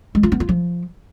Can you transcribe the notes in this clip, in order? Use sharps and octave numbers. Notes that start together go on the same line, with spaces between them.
G#3
F4
B3
F4
F3